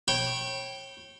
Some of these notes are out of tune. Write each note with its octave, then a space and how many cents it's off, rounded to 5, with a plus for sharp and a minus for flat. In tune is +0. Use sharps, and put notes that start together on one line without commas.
C#5 -30 G5 -10 B5 -15